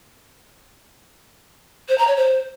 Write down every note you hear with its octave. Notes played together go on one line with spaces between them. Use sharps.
C5
A#5
C#5
C5